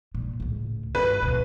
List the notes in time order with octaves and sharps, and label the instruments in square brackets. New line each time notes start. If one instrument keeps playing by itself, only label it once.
[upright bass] A#2
C#2 A2
[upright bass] G2 D#3 [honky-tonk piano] B4
[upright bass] D2 B2